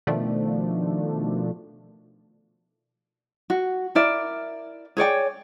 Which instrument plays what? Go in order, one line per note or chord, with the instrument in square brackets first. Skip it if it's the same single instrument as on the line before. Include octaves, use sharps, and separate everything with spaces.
[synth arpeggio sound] B2 D#3 F3 A3 D4
[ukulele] F#4
E4 A#4 D5 E5
G#4 C#5 D5 G5